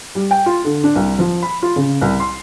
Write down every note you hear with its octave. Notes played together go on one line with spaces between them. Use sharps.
G3
G5
F4
D3
D4
C2
F3
B5
F4
C#3
C2
C6